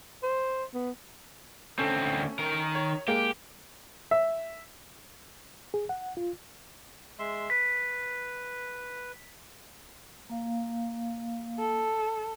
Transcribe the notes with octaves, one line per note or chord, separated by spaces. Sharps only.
C5
B3
D2 C4 C#4 A4
D#3 A#4
C#5
G#3 A#3 G4
E5
G#4
F#5
F4
G#3 E5 C6
B4 B6
A#3 F5
A4